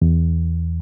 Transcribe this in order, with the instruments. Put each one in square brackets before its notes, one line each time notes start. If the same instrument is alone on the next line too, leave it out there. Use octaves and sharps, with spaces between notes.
[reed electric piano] E2